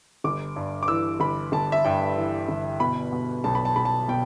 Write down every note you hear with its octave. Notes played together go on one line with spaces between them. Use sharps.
G1 D6
G2
D6
E3 E6
G1 B5
G1 A5
E5
G2 G5
E3
G1
B2 B5
B2
B1 A5
B5
A5
B1 B5
A5
B2 G5